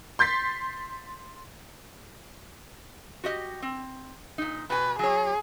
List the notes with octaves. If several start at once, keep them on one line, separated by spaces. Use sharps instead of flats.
C6 G6 A6 B6 C7
F#4 G4 D#5
C4
A#2 D#4
B2 B4 G#5
F#3 G#4 C#5